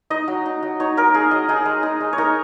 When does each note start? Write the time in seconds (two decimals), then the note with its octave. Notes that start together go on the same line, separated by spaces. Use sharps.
0.10 D#4 D#5
0.28 F#3
0.46 D#4
0.63 F#3
0.80 D#4 C#5
0.97 F#3 A#4
1.14 D#4 G#4
1.31 F#3 D#5
1.49 D#4 G#4
1.66 G#3
1.83 D#4
2.01 G#3
2.13 C#5
2.18 D#4 A#4